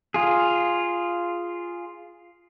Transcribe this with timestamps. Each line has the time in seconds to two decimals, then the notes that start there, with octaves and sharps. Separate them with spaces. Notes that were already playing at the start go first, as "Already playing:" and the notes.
0.14 F4 G#4